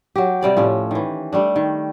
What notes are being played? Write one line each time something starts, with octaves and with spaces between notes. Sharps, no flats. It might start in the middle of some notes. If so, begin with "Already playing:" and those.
F#3 G4
C3 G3 D5 G5
A2 F3 C#4
D#3 E3
G3 A3 D4
D#3